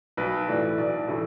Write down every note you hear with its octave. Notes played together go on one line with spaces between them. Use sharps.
B1 B4
A2 E3 A3 D5
B4
B1 D5
A2 E3 A3